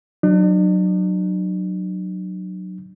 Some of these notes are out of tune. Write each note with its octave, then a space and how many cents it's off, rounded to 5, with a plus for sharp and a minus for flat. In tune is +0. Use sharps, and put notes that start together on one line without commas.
F#3 +0 D4 +45